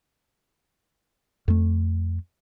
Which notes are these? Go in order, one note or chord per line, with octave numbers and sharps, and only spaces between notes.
F2 A3